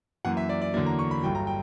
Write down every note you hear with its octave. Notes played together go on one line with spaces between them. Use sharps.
F#2 E3 A#3 F#5
E5
D5
D5
E2 D3 F#3 A#3 D5
A#5
C#6
B5
G1 G2 F#3 G5
A#5
G5